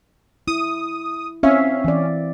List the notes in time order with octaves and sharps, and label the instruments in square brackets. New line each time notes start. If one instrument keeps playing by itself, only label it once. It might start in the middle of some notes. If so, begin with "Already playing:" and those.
[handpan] E4 [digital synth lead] D#6
[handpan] C4 E5 F5 [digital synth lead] C#4
[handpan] E3 D5